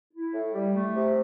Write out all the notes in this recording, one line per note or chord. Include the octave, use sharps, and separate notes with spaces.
E4
A2
G3
A3
C3